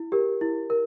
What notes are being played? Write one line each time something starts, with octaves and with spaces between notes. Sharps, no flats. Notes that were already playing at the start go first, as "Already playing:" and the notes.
Already playing: E4
G4 A#4
E4
A#4